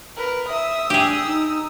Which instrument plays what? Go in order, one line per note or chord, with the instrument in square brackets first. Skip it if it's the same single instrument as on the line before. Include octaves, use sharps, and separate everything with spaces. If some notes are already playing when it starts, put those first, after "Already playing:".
[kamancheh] A#4 B4
[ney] E5 [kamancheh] D#6 E6
[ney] D4 [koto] G4 G#4
[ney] D#4